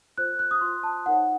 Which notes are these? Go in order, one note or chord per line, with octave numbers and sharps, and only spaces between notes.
F4 C5 F#6
F#6
D#6
F4 C5 C6
A5
D#4 A#4 C#5 F#5